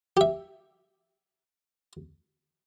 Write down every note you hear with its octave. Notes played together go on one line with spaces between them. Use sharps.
G4 E5